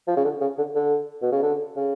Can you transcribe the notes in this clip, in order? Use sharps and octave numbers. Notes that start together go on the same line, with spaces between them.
F3
C#3
D3
C#3
D3
D3
B2
C#3
D3
C#3